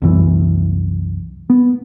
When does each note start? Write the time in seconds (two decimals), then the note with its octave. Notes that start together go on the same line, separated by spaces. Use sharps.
0.02 C2 F#2 E3
1.50 B3